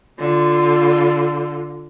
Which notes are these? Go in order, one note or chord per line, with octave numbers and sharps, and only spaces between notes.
D3 F4